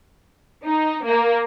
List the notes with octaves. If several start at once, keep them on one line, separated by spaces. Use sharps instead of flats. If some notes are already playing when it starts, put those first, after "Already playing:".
D#4
A#3